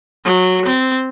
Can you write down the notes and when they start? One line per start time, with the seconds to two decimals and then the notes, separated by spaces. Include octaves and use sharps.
0.25 F#3
0.66 C4